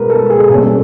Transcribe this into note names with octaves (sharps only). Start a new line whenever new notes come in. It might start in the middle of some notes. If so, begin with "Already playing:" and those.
Already playing: B2 G#3 A#4 B4
A4
G#4
B2 G3 A#3 C#4 A4